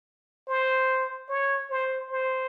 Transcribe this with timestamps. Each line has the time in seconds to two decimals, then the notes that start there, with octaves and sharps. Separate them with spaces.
0.48 C5
1.29 C#5
1.70 C5
2.11 C5